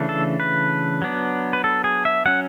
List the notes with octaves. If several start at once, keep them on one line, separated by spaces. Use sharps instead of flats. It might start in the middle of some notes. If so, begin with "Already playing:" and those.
Already playing: C#3 E3 A3 D4
A4
B4
F#3 B3 D4
B4
A4
G#4
E5
F#3 C#4 F#5